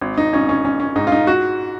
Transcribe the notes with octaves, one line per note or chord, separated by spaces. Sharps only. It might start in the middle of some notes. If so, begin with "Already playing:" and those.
G#1
D#4
G#1 C#4
C#4
G#1 C#4
C#4
G#2 D#4
F4
D#4
F#4